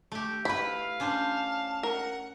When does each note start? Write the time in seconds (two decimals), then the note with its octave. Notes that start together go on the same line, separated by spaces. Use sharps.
0.12 A3 G4
0.45 E4 B4 F5 B5
1.00 C#4 D4 C5 A5
1.83 A#4 F#5